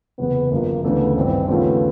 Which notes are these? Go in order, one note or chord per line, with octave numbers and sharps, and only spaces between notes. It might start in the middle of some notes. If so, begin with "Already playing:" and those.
F#1 E2 C3 B3
G1 F#2 C#3 F3 A#3
D2 C#3 E3 A3 B3 D4
G#1 G2 E3 C4
D#2 C#3 F3 A3 B3 C#4